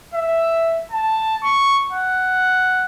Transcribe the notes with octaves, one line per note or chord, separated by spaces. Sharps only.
E5
A5
C#6
F#5